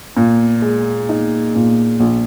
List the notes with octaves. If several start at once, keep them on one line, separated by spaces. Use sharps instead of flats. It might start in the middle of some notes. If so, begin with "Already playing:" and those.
A#2
G#3
D#4
A#2
A#1